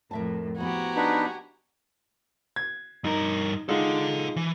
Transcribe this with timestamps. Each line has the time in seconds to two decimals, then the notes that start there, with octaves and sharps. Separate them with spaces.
0.11 F2 A2 A#4 E5 A5
0.58 F3 B3 E4 F#4 G4 G#5 A#5
0.96 D4 D#4 B4
2.56 G#6
3.04 G2 D#4 A#4
3.69 G#3 D#4 F4 A4 F#5
4.36 E3